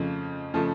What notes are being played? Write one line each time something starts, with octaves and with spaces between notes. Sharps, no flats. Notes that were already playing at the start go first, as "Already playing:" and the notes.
Already playing: F2 C#3 F3 A3
C#3 F3 A3